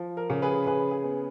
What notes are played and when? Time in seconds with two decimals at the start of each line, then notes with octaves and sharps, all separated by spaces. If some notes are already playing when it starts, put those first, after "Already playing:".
Already playing: F3
0.17 A#4
0.30 C#3
0.42 G#4 B4
0.66 C#3 G#4 B4
0.91 G#4
1.04 B3